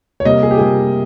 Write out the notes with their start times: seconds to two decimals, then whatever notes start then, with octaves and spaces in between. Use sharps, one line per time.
0.20 C#5
0.25 C3 G3 A#3 D#5
0.43 G#4
0.51 G4
0.58 C3 G3 A#3 G#4